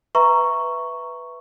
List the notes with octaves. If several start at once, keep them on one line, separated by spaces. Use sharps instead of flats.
B4 E5 A#5 C#6